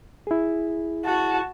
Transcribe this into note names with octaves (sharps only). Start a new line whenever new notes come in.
E4 G#4
F#4 A5